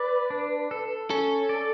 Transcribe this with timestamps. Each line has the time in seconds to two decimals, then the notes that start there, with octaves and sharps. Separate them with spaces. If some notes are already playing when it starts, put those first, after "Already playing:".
Already playing: B4 D5
0.30 D4
0.71 A4
1.10 C#4 A4
1.49 D5